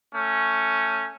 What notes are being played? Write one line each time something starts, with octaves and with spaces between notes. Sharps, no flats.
A3 C#4